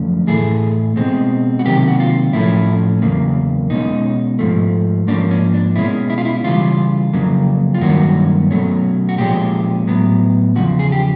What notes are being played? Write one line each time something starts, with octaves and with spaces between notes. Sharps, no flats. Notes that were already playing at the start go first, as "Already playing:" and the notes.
Already playing: F#2 D3 F3 A3 C#4
A2 E3 A3 G#4
B2 G#3 C4
F#4
C3 D#3 F#3 A#3 G4
F#4
F4
A2 F3 A3 C#4 E4
E2 C#3 F#3 A#3
B2 G#3 C#4 D#4
G#2 F3 A3
G#2 F3 A#3 C#4 D4
C#4
D4
B2 G#3 C#4 E4
E4
F4
E4
C#3 E3 G3 F4
F2 C#3 F#3 A#3
F4
G2 D#3 F#3 A#3 C#4 F#4
B2 F#3 A3 C#4
F#4
A#2 F3 G#3 C#4 G4
A2 F#3 B3
E2 C#3 F3 F#4
G#4
G4